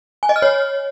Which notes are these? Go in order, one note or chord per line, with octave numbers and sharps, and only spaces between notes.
G#5
D#5
F6
C#5